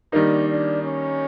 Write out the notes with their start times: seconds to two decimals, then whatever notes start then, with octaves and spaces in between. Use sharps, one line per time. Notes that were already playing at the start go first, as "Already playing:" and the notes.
0.12 D#3 G3 A#3 D4 D#4
0.49 D4
0.84 C#4